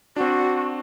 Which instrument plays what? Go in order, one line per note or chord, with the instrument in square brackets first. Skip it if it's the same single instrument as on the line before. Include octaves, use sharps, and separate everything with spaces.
[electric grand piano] C4 D4 [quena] F#4